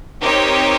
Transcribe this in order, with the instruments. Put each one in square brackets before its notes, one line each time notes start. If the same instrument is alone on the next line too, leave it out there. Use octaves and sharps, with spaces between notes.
[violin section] C4 D#4 G4 A#4 C#5